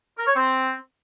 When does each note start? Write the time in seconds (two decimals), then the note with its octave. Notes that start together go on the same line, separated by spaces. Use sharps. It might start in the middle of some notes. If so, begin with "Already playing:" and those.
0.18 A#4
0.27 C#5
0.35 C4